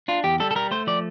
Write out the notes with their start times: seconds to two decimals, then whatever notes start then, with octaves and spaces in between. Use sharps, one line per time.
0.08 D4 F4
0.24 E2 G4
0.40 G3 A4
0.51 A4
0.55 G3 A#4
0.71 A3 C5
0.87 F3 D5